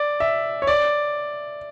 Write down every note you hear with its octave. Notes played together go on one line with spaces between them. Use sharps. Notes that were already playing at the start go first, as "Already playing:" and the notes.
Already playing: D5
E5
C#5
D5